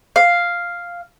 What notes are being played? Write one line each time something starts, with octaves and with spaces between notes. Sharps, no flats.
F5